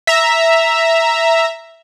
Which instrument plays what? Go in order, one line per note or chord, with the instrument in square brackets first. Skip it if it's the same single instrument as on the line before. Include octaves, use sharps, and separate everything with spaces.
[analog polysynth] E5 A#5